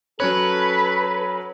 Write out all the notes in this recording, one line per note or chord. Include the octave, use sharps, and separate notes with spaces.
F#3 C#4 A4 B4 C#5